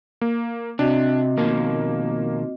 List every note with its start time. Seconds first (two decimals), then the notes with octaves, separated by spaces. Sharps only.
0.21 A#3
0.79 C3 C4 D4 F#4 D#5
1.37 B2 D#3 F3 A#3